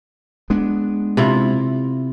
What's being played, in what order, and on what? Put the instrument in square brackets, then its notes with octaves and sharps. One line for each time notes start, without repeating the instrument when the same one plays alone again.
[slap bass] G#3 B3 D4
[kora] C3 E4 F4